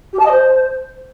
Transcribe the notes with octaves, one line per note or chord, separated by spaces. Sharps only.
G4
A5
D#5
C5